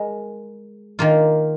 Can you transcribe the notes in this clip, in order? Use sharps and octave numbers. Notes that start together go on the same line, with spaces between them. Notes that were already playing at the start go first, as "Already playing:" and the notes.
Already playing: G#3 A#4
D#3 A#3 F4